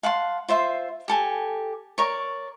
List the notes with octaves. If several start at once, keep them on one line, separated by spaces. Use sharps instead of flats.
F5 F#5 A5 C6
F4 C5 E5 C6
G4 A4 G#5
A#4 C#5 D5 C#6